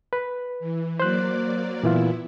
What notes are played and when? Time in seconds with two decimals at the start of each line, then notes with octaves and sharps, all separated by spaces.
0.13 B4
0.60 E3
1.00 F#3 A#3 C5 D5 F#6
1.83 A#2 E3 B3 E4 F4